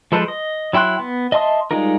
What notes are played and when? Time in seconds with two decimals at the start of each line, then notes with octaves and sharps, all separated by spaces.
0.12 F3 G#3 A4 B4 C5
0.28 D#5
0.73 F#3 E4 G5 C6 F#6
0.99 B3
1.32 D#5 E5 A5 C6 D#6
1.71 G3 G#3 D#4 F4 A#4